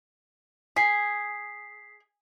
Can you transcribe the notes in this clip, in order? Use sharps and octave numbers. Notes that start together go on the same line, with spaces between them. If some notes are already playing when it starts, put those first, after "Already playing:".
G#4 B6 C7